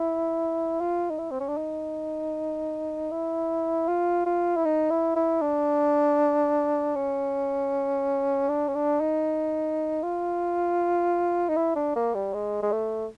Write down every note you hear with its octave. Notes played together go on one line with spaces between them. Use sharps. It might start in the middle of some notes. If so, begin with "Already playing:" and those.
Already playing: E4
F4
D#4
E4
C4
C#4
D4
D#4
E4
F4
F4
E4
D#4
E4
E4
D4
C#4
D4
C#4
D4
D#4
F4
D#4
E4
D4
A#3
G3
G#3
G#3
A3